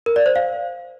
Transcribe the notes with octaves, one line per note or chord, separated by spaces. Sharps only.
A#4
D5
C5
F5